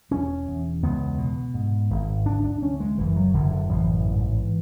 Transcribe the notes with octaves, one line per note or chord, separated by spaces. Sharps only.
E1 C#4
E2
C#2 B3
B2
G#2
G#1
D2 D4
D4
D2 C#4
G#3
F#1 E3
F#3
F#1 D3
D3
A1 E3
G#2